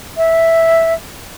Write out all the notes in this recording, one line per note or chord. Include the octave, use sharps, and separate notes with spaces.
E5